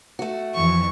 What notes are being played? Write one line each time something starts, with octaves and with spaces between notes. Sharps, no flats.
A3 F#4
F2 E3 C#6